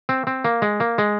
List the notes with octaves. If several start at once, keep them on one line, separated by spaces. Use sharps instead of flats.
C4
C4
A#3
G#3
A#3
G#3